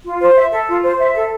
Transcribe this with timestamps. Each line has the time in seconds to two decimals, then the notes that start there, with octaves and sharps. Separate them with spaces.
0.06 F4
0.21 C5
0.36 E5
0.53 A4
0.68 F4
0.84 C5
0.99 E5
1.15 A4